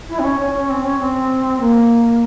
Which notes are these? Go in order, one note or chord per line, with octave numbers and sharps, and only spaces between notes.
E4
C4
C#4
C#4
C#4
C4
C#4
C4
A#3